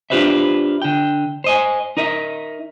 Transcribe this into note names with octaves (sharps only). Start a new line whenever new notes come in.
D4 F4 G4 B4 C5 E5
D3 G5
C5 D#5 G#5
D#4 A#4 D#5 E5